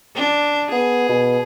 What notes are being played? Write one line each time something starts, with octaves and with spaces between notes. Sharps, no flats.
D4
B3 G#4
B2